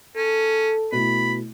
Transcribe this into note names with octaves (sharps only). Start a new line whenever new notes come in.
C#4 A4
B2 A3 E4 B5